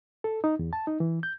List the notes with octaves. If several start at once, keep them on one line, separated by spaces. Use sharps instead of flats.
A4
D#4
E2
A5
D#4
E3
G6